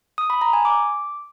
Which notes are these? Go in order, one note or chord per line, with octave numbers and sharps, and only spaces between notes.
D#6
B5
A#5
G#5
D6